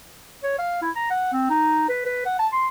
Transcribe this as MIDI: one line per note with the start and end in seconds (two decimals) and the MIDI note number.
0.43 0.56 73
0.58 0.79 77
0.82 0.90 64
0.95 1.06 82
1.10 1.28 78
1.33 1.47 60
1.50 1.89 63
1.89 2.03 71
2.05 2.24 71
2.26 2.35 78
2.39 2.47 81
2.52 2.67 84